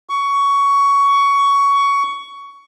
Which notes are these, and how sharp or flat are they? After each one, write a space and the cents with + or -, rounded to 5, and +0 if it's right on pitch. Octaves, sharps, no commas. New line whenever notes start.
C#6 +15